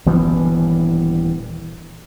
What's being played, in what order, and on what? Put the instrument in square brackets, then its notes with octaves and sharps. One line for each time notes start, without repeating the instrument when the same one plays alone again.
[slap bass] D#1 G2 E3 B3